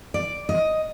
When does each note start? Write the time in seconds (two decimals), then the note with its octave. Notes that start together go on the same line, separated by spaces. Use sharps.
0.14 D5
0.49 D#5